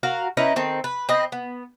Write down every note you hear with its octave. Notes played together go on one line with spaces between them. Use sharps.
F#4 A#4 F5
C#4 D#4 E4 B4
D#3 C4 A4
B4
C4 B4 D#5
B3